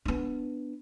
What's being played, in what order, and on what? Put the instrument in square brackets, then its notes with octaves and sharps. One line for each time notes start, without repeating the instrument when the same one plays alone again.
[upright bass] B3 D4